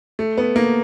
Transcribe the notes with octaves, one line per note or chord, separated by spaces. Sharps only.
A3
B3
A#3